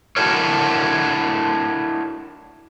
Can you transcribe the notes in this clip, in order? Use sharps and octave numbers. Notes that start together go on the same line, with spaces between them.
D4 E4 F#4 A4 A#4 C#5